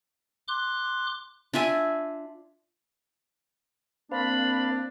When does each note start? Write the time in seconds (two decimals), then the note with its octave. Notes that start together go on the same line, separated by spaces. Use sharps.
0.48 C6 D6 F#6
1.53 D4 F4 E5 G#5
4.12 A#3 C4 D4 C5 F5 B5